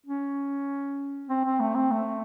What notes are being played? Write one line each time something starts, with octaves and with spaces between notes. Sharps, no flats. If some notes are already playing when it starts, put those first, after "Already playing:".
C#4
C4
C4
A3
C4
A3